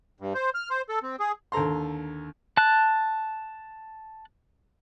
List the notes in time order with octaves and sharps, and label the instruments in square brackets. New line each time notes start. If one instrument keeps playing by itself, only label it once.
[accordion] G2
C5
F6
C5
A4
C4
G#4
[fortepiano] D#2 D3 A4 A#5 C6
[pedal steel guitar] A5 F#6